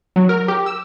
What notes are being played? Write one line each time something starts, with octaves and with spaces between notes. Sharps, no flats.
F#3
A#4
G4
E6